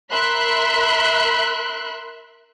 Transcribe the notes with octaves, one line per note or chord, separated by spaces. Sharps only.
A#4 E5 B5 C6 F#6